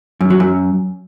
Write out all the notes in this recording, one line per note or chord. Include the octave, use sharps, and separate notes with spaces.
F#2
F#3
F#2